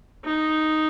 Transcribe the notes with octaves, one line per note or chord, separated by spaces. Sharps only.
D#4